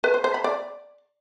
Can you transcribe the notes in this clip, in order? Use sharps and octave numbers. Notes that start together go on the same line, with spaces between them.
B4
C5
C5
B5
D5